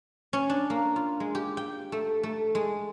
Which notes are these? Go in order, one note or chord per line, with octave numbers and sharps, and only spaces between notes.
C#4
D4
A#3
F4
G#3
G4
G5
A3
A3
G#3